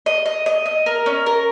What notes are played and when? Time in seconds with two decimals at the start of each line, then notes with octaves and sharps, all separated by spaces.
0.06 D#5
0.26 D#5
0.46 D#5
0.66 D#5
0.86 A#4
1.06 C#4
1.26 A#4